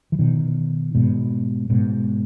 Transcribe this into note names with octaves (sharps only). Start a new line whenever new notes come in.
E3
B2 D#3
G#2 B2
G#2 B2